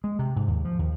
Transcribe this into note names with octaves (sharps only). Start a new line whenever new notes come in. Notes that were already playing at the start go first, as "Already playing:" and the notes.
G#3
C3
G#2
D#2
F3
D#2